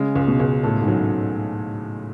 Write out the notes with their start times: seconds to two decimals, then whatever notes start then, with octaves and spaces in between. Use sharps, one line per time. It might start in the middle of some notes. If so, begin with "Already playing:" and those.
Already playing: C#3 G#3
0.16 C#2
0.27 B2
0.40 C#2
0.63 A2 A4
0.82 G#2
0.88 F#3